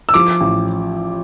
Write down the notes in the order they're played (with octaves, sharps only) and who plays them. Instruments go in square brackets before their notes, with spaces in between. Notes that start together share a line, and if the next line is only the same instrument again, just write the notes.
[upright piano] E6
F3 D6
A1